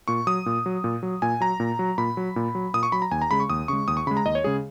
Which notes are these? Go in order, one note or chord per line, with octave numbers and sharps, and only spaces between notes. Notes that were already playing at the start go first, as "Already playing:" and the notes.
A#2 C#6
F#3 D#6
A#2
F#3
A#2
F#3
A#2 G#5
F#3 A#5
A#2
F#3
A#2 B5
F#3
A#2
F#3
A#2 D#6
C#6
F#3 B5
A#5
D#2 G#5
A#5
C#3 G#3 B5
C#6
D#2 D#6
C#3 G#3 C#6
D#2 D#6
C#6
C#3 G#3 B5
A#5
D#2 D#5
C#5
C#3 G#3 G#4